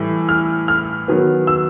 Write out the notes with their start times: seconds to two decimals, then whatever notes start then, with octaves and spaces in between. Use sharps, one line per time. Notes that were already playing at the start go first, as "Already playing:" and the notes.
Already playing: A2 E3 G3
0.29 F6
0.68 F6
1.08 D#3 F#3 B3
1.47 E6